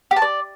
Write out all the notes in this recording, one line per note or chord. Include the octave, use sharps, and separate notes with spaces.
G4
A5
D5